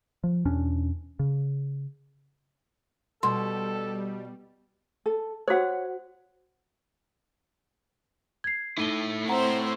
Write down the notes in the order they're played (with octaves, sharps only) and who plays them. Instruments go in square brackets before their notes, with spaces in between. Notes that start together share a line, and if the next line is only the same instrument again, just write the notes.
[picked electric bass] F3
E2 B2 C#4 D4
C#3
[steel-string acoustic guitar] B2 [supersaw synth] G3 [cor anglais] A4 [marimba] C6
[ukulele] A4
[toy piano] F#4 C5 [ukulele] C#5 F#5
[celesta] G#6 C7
[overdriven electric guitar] A3 E4 [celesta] D#4 D#7 G7
[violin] C4 C5 [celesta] F#5 A#5